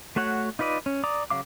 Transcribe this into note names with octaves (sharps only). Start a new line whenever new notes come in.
A3 F#4 C#5 F#5
D#4 F4 B4 D5 D#5
C#4
D5 A#5 D6 D#6
C#3 F#3 F5 D6